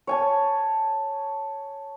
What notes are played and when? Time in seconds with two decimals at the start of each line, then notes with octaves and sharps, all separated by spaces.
0.07 C#5 G#5 A5